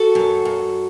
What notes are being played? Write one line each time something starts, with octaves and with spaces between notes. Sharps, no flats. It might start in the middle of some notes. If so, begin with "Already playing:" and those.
Already playing: F#4 A4
F#2
F#2